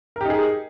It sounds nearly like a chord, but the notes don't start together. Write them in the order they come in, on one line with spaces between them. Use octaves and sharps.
A#4 G4 D#4 G#4